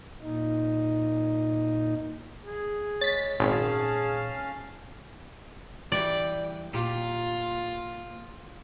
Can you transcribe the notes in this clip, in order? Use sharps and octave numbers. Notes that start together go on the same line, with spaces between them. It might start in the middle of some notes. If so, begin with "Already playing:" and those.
A#2 D#4
G#4
G#3 C#5 A6 B6
G#1 A#2 C#4 G#4 F5 A5
E3 G3 D5 G5
A#2 F4 G4